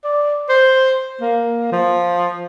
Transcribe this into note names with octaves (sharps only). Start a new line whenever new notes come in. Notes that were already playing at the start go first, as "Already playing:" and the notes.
D5
C5
A#3
F3